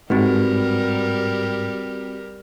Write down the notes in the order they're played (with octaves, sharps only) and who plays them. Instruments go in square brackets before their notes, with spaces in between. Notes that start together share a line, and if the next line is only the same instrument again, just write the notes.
[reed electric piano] G#2 [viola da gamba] G3 G4 A#4 [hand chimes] C4 F#4 B4